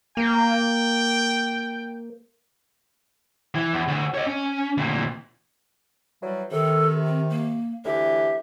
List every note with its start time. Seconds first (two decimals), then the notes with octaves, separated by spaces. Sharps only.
0.17 A#3 G5
3.55 E3
3.73 E2
3.88 D2
4.14 C#5 D#5
4.27 C#4
4.77 D2 A#2
6.22 E3 F#3 G3
6.52 C3 D#3 A4
7.05 C4
7.30 A#3
7.85 D2 E3 G4 E5